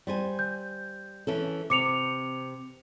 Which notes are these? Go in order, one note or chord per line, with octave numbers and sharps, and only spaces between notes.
G3 C5 G#5
G6
E3 C#4 A4
C3 D6 C#7 F7